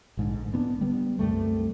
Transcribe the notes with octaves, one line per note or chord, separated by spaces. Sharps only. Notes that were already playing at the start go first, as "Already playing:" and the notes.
A#1 G#2 D3
G#3 B3 C4 D4
D3 G3 B3
C2 F#2 G3 A3